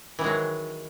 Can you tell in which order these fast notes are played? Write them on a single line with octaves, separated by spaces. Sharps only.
E3 D#3 G#3 F#3